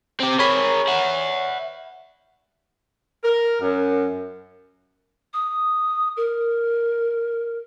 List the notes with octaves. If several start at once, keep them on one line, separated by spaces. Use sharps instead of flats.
C4 G4
G#4 A#4 C#5 B5
E5 F#5
A#4
F#2
D#6
A#4